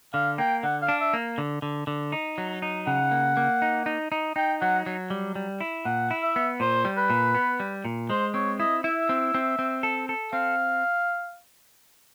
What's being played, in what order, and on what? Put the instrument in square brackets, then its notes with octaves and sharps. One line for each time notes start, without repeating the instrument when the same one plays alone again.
[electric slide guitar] D3 [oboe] F5
[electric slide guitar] A#3 [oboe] G5
[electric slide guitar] D3 [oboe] F#5
[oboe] F5
[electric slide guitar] D4
[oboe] E5
[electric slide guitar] A#3
D3
D3
D3
D#4
F#3
D#4
[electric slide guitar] C#3 [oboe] F#5
[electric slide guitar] A#3
A#3
D#4
D#4
D#4
[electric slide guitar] D#4 [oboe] G5
[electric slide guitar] F#3 [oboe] F#5
[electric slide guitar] F#3
G3
G3
E4
[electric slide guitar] A#2 [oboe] F#5
[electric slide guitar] E4
[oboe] E5
[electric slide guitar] B3
[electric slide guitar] A#2 [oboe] C5
[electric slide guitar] G3
[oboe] B4
[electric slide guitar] A#2
B3
G3
A#2
[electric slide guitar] G#3 [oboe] C5
[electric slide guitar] C4 [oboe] C#5
[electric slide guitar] E4 [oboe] D#5
[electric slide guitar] E4 [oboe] E5
[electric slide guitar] C4
C4
C4
A4
A4
[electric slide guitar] C4 [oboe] F5